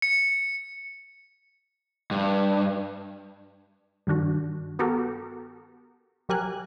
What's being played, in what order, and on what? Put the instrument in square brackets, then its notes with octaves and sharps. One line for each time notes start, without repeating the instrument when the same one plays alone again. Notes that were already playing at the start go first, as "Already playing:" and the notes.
[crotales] C#7
[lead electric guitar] G2
[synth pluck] G2 D#3 D4 F#4
B3 F#4 G4 A4 A#4
F#3 G4 A#4 G#5 F#6